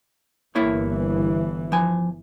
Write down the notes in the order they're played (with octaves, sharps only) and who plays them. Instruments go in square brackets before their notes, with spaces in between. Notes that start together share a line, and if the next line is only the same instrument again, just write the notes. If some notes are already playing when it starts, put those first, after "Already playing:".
[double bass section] G1 E3 [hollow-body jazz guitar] A#3 E4 C#5
[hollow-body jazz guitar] F3 G#5